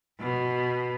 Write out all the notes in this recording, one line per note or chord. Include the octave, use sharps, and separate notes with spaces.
B2